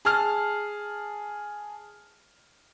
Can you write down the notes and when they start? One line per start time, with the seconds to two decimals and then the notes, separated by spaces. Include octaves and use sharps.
0.05 G#4 A5 F6